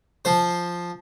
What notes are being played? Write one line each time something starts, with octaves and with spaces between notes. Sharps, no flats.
F3 C5